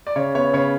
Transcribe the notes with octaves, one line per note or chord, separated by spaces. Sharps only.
D5
C#3 C#5
B3 C#5
C#3 C#5